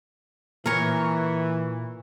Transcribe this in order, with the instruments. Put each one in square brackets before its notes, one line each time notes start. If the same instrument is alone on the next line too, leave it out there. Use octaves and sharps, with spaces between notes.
[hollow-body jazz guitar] A#2 [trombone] E3 [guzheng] A#4 C#5